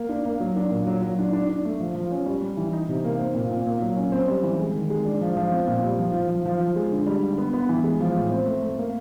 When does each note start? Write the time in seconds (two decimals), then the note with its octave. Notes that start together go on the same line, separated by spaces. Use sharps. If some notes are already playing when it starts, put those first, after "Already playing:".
Already playing: A#3
0.09 D4
0.25 A#3
0.40 F#3
0.56 D4
0.71 A#2
0.87 F#3
1.02 F#3
1.19 D4
1.33 D4
1.49 D4
1.65 A3
1.80 F3
1.95 F3
2.11 C#4
2.26 G3
2.41 G3
2.57 E3
2.73 D#4
2.88 C3
3.04 A#3
3.19 C4
3.35 A#2
3.51 A#2
3.66 A#3
3.82 F#3
3.97 C#4
4.12 C4
4.28 G3
4.43 E3
4.60 G#3
4.75 D#3
4.90 G#3
5.05 D4
5.21 F3
5.37 F3
5.51 C4
5.68 A#2
5.83 G3
5.99 F3
6.13 F3
6.29 F3
6.46 F3
6.61 F3
6.76 G#3
6.92 D3
7.07 G3
7.23 D3
7.38 B3
7.53 B3
7.69 E3
7.84 G#3
8.00 F3
8.16 A2
8.31 C4
8.46 A3
8.62 A3
8.78 A#3